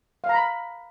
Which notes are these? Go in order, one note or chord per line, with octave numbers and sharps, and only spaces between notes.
F5
A#5
B5